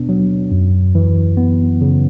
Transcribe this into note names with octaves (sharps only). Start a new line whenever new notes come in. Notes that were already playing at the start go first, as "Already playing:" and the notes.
Already playing: B2 B3 D4
F#3
F#2
E3
B3
C#3